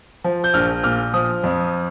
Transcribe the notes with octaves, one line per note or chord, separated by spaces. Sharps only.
F3
G6
A#1 F6
A#2 F6
F3 D#6
F2